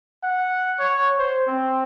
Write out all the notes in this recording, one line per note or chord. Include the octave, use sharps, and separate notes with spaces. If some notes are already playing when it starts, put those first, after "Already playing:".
F#5
C#5
C5
C4